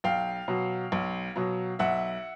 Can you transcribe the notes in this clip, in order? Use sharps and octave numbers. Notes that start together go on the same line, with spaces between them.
B1 F5 G5
B2 F#3
B1
B2 F#3
B1 E5 F#5